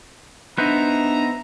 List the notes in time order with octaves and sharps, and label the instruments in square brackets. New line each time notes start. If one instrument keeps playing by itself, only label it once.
[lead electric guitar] B3 D#4 [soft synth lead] D4 [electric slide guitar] B4 C5 [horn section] E5 A#5